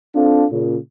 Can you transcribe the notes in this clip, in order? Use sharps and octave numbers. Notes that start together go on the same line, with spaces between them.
C4 D4 F4 A4
A#2 C#3